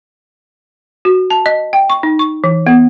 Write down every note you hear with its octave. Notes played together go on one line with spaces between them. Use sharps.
F#4
A5
D#5
G5
C#6
D#4
C#6
E3
B3